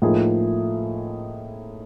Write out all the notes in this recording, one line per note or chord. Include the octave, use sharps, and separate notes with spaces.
A2 F3 A#3 D#4 G#4